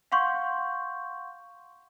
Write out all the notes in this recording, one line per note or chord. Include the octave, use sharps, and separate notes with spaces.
F5 F#5 C6 C#6 G6